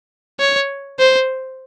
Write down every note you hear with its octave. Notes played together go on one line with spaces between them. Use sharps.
C#5
C5